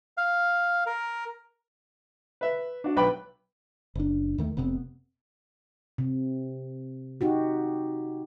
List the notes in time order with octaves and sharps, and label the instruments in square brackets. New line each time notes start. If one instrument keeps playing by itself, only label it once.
[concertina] F5
A#4
[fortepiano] B4 E5
D4 F#4
B1 B4 G5 B5 D6
[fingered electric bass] F#1 D4
D#2 D#3 A3
F1 C3 B3 C4
[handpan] C3
D#4 F#4 G4